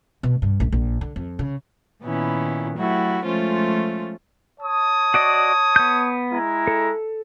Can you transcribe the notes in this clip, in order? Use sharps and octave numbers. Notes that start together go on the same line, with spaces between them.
B2
G2
A#1
A#1
D3
F2
C#3
A#2 D#3 B3 C#4 E4
F#3 A3 E4 F#4 G4
F3 G#3 A3 C#4 F4 C5
C#5 A5 D#6
F#4 D5 D#5
B3 G6
G#3 E4 A#5
A4